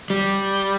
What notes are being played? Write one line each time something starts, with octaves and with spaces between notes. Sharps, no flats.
G3